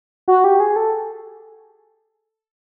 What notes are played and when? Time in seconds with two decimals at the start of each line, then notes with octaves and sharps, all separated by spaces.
0.28 F#4
0.44 G4
0.60 G#4
0.76 A4